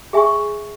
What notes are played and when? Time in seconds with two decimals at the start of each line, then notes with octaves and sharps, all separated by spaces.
0.13 G#4 E5 G#5 C#6